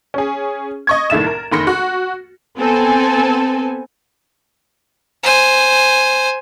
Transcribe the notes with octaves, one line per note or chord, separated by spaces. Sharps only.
C#4 G#4
D#5 C#6 G#6
C2 A2 D#3 E5 A6 E7
A#4
F1 D#3 B5 C6 A#6 C#7
F#4
B3 C4 A4 G#5
C5 G#5